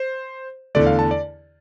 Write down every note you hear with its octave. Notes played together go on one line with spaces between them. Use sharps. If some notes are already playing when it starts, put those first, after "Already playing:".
Already playing: C5
E2 D3 A3 D5
F5
A5
D5